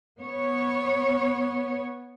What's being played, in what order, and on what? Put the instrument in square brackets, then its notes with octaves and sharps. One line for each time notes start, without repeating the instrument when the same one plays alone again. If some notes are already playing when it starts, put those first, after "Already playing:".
[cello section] B3 C#5